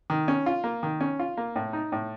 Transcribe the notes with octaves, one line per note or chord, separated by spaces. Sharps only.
D#3
C#4
F4
A#3
D#3
C#4
F4
A#3
A2
D#4
A2